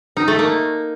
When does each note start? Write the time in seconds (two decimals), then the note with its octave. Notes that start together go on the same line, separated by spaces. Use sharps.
0.17 D#4
0.28 A3
0.39 A#3